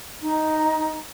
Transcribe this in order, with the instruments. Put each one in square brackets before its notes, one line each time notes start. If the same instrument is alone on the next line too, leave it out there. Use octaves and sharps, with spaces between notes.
[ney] D#4